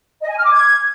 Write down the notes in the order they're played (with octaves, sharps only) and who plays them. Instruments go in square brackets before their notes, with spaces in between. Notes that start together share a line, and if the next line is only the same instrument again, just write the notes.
[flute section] D#5
G#5
F6
D6
G#6